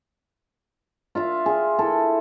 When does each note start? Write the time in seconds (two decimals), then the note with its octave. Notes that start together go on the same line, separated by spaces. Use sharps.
1.15 F4 E5 F5
1.46 G#4
1.79 E4 A4